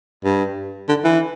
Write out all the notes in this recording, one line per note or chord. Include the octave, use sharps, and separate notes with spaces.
G2
D3
E3